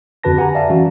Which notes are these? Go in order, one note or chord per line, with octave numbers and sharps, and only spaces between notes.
F2 D3 F#4 B4 A5 A#6
G4 F#5 G#5 A#5
D5 E5 F5 A5
E3 F#3 C#4 F#4